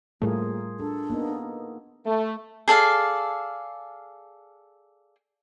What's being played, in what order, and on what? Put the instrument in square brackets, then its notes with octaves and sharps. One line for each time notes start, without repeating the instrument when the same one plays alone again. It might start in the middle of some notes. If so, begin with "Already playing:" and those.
[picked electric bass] A2 G3 A3 [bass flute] A#3 [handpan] F4 G#4 A#4
[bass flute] D4 [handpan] A4
[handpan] A#3 B3 D#4
[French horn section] A3
[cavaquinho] G#4 A4 D5 F5